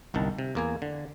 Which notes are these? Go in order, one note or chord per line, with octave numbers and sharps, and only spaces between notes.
G1 C2 D#3 A5
C3
E2 A#3 G#5
D3